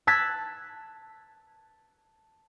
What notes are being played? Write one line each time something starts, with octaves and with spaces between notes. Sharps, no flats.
A5 E6 F#6 G#6 A6 B6